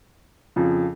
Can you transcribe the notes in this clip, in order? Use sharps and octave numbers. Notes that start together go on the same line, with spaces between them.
F2 C#3 F3